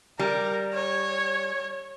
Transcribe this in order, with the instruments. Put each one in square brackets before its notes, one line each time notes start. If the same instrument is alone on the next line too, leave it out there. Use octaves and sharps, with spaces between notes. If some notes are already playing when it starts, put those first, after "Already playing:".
[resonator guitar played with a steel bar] G3 [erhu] A#4
[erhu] C#5